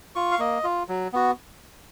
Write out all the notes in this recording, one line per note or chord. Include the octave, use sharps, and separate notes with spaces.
F4 C#6
F5
A#3 D#5
F4
F#3
B3 F#4